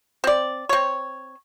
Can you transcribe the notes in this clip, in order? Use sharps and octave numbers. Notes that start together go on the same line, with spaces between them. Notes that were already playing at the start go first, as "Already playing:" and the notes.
C4 D5
C4 C#5